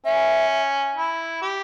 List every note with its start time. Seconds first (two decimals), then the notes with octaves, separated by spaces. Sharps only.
0.05 C#4 E5
0.96 E4
1.42 G4